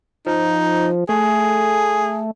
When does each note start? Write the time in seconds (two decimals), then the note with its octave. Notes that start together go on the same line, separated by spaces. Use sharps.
0.27 F3 D#4
1.09 A3 G#4